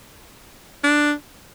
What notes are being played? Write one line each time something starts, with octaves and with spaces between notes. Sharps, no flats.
D4